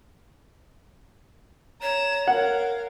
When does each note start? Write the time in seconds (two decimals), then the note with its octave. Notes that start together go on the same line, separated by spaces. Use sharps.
1.82 C#5 A#5 E7
2.27 A#4 F5 F#5